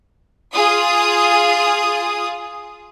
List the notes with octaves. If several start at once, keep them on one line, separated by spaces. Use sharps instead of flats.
F4 G#4 D#6